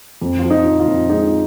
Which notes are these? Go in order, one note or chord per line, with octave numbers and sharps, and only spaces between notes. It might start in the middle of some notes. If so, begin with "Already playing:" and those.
F2
F3 F4
D#4
F3
F4
F2
G#3 D#4